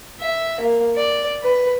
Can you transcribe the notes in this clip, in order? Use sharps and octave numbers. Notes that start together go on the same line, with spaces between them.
E5
A#3
D5
B4